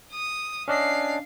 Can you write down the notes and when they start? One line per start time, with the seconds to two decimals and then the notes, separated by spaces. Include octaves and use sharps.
0.12 D#6
0.68 C#4 D4 D#5 F5 C7